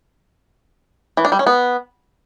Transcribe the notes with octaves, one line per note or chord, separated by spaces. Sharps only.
E3
D4
G3
C#4
B3